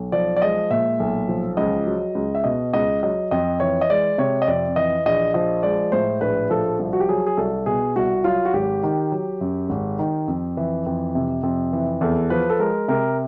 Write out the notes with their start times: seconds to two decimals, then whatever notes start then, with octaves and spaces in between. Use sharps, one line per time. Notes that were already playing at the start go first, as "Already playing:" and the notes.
Already playing: B1
0.12 F3 D5
0.36 D5
0.42 G#3 D#5
0.70 A#2 E5
1.00 B1
1.28 F3
1.57 C#2 D#5
1.87 F#3
2.15 C#2
2.35 E5
2.44 B2 D#5
2.73 C#2 D#5
3.03 F#3 D#5
3.31 F2 D#5
3.60 E3 C#5
3.81 D#5
3.90 G#3 D5
4.18 C3 C#5
4.42 D#5
4.48 F2 D5
4.76 E3 D#5
5.05 A#1 D#5
5.34 F3 D#5
5.63 G#3 D5
5.92 A2 C5
6.21 A#1 B4
6.50 F3 A4
6.79 C2
6.93 F#4
7.00 G4
7.09 F#3 G#4
7.27 G#4
7.37 C2 A4
7.66 B2 G#4
7.96 C2 F#4
8.24 F#3 F4
8.45 F#4
8.53 G#1 G4
8.83 D#3
9.12 F#3
9.41 F#2
9.69 G#1
9.99 D#3
10.28 F2
10.57 E3
10.86 F2
11.15 C3
11.43 F2
11.73 E3
12.01 E2 A4
12.30 F3 B4
12.50 A4
12.59 G#3 A#4
12.88 C3 A#4